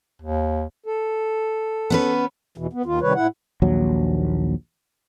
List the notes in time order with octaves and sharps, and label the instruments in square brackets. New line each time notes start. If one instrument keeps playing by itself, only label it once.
[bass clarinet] D#2
[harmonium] A4
[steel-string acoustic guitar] B3 C#4 B4
[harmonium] E2 B2 E3
B3
D#2 D#3 F4
C3 D#3 G3 B4 C#5
A2 E4 F#5
[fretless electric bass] A#1 D#2 F#3